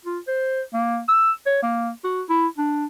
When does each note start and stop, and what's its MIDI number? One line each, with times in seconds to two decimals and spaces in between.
0.05 0.19 65
0.28 0.61 72
0.74 1.00 58
1.08 1.32 88
1.46 1.60 73
1.63 1.89 58
2.04 2.22 66
2.29 2.47 64
2.58 2.86 62